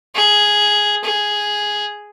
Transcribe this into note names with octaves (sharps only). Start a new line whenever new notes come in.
G#4
G#4